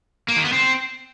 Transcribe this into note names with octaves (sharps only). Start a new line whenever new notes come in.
A#3
D#3
B3
C4